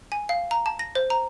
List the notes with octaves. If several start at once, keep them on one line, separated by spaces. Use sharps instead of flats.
G#5
F5
A#5
A5
A#6
C5
A#5